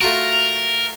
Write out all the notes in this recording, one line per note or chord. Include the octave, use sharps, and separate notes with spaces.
A3 F4 F#4 A#4